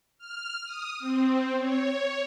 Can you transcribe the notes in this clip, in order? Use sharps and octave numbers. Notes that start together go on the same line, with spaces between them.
F6
D#6
C4
C#5